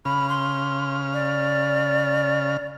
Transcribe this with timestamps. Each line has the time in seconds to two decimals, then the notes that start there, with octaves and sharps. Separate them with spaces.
0.05 C#3 B5 F6
0.29 C6
1.14 D5